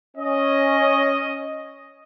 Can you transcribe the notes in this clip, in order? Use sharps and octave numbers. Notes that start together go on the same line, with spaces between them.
C#4 D#5